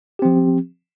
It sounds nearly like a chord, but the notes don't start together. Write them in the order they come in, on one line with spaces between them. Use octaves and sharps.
G4 C4 F3